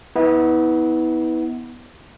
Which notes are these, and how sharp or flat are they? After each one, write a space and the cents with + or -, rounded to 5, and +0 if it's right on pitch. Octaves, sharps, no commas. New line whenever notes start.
B3 +0 E4 -40